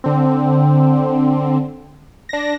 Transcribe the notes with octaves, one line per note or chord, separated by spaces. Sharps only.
D3 C4
D4 A#6